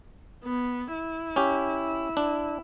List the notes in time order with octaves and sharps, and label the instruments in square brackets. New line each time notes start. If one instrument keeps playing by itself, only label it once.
[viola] B3
E4
[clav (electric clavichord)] C#4 G4
D4